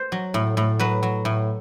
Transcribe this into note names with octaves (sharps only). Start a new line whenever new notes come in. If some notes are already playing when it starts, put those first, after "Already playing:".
Already playing: C5
F#3
A2
A2
F#3 B4
F#3
A2